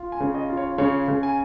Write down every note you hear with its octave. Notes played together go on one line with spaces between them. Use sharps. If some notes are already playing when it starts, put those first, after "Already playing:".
Already playing: F4
G#5
C#3
D#5
F4
C#5
C#3 C#5
C#3
G#5